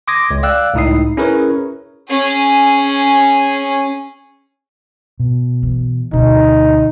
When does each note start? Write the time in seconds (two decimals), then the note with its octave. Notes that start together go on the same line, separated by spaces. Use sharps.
0.08 C6 D6 D#6 G#6 A#6
0.31 C#2
0.43 D5 F5 G5 E6 F#6
0.74 C#2 A2 D#4 E4 D#6 C7
1.17 C#4 E4 G#4 A#4 B4 C#5
2.09 C#4 G#4
5.20 B2
5.63 E3
6.13 D2 B2 D#4